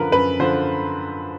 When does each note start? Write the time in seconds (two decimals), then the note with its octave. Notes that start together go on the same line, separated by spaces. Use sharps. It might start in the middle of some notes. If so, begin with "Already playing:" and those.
Already playing: F#2 D3 F3 A#4 B4
0.12 F#2 B4
0.40 D3 F3 C5